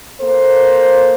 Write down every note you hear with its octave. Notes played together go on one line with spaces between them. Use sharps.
A#3 A4 C5